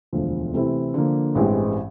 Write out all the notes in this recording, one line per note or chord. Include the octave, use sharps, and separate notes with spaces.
E1 D2 D3 F3
C3 E3 A3 C4 E4
D3 F3 A#3
A1 G2 E3 G#3 C4